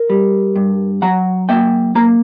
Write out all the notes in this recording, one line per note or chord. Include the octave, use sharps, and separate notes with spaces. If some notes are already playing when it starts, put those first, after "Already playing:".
Already playing: A#4
G3
G2
F#3 F#5 A#5
A#3 E5 G5
A#3 A#5